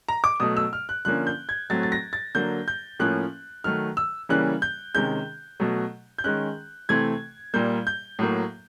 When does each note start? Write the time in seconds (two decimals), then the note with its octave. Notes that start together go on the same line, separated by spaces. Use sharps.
0.09 A#5
0.24 D6
0.40 B2 F#3 A3 D#6
0.57 E6
0.73 F6
0.89 F#6
1.05 D3 F3 A#3 C#4 F#6
1.27 G6
1.49 G#6
1.70 A2 F#3 A3 C4 A6
1.83 A6
1.92 A#6
2.13 A6
2.35 D3 F#3 A#3 G6
2.68 G6
2.99 A2 F3 A#3 C#4 F#6
3.64 D#3 F#3 A3 F6
3.97 E6
4.29 C#3 E3 G3 A#3 C#4 F#6
4.62 G6
4.95 C3 D#3 G#3 C#4 G6
5.60 B2 F#3 A3
6.18 G6
6.24 D#3 G#3 C#4 F#6
6.89 C3 E3 A3 C4 G#6
7.54 A#2 G3 A#3 G6
7.87 G6
8.19 A2 F#3 A#3